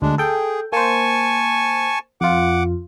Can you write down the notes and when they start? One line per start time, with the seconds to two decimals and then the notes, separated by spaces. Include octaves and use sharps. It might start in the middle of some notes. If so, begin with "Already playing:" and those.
0.02 D2 G#3 D4
0.18 G#4 A4 G5
0.73 A#3 C5 G#5 A5 C#6
2.21 F2 F4 F#5 D6